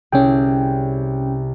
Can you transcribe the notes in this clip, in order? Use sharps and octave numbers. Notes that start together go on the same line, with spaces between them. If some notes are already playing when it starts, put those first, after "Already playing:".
C2 C#4 G#4 G5